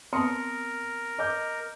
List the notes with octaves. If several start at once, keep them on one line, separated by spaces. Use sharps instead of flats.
B3 C4 A#4 C6 D#6 C#7
D#5 D6 G6